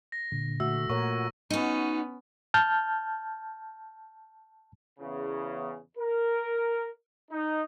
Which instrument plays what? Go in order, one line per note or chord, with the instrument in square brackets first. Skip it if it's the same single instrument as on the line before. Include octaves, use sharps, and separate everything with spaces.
[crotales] A#6
[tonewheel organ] A#2 D3
[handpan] A3 F#4 E5 [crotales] E6
[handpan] A#2 A#4 C#5 [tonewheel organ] F#5 [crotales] C#6
[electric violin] B3 C#4 [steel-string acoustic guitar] D#4 F#4
[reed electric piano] A5 F6 G6
[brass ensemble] E2 C#3
A#4
D#4